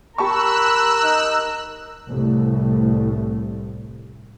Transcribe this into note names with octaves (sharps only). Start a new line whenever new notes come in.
G4 A#4 A5 B5 C#6 E6 F#6
D#4
C2 A2 A3